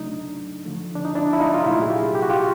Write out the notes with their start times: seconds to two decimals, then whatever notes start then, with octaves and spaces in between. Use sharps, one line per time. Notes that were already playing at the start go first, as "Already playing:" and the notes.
Already playing: C#3 F#3 A3 D4 D#4
0.65 D3 F3 A3
0.95 D4
1.05 D#4
1.15 D4 E4
1.33 E4
1.40 D#4 F4
1.54 F4
1.64 A#2 F#3 A3 E4 F#4
1.82 G#4
1.90 F4 G4
2.15 G4
2.22 F#4
2.30 F4 G4